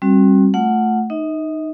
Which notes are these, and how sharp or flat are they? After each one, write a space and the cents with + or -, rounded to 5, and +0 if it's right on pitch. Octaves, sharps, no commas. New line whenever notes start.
G3 +0 C4 +40 F#4 +0
A3 +0 F4 -10 F#5 +0
D#4 -10 D#5 +45